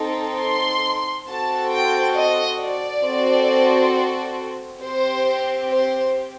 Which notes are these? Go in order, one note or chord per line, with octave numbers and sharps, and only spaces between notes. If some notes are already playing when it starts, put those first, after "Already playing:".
Already playing: C4 D#4 A4
C6
C4 F#4 A4 A5
G5
D#5
D5
C4 F#4 A4
C4 G4 C5
C5